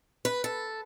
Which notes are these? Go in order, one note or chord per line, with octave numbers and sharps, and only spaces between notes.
B4
A4